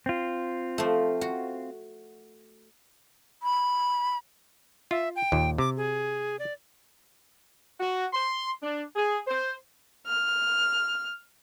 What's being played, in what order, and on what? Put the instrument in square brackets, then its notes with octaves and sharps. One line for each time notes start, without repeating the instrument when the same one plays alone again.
[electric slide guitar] C4 F4
[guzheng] F3 A3
F#4
[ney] B5
[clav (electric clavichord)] F4 [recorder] E5
[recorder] G5
[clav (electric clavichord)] D#2 A#2
[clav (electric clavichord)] C3 [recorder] D6
[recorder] G#4
D5
[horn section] F#4
C6
D4
G#4
C5
[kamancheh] F6